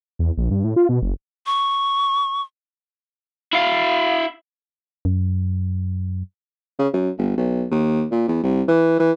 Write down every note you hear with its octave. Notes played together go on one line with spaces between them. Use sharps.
E2
A#1
G2
A2
F4
B2
F#1
C#6
E4 F5
F#2
C#3
F#2
G1
B1
D#2
A#2
E2
C2
E3
E3